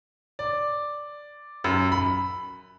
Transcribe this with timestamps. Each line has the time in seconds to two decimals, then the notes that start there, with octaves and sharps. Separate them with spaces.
0.39 D5
1.64 F#2
1.92 B5